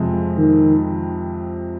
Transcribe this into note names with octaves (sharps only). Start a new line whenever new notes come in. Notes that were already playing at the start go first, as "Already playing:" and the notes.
Already playing: F2 C3 F3 G#3
D#3